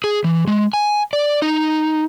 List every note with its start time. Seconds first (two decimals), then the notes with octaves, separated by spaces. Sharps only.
0.04 G#4
0.24 E3
0.47 G#3
0.73 G#5
1.13 D5
1.42 D#4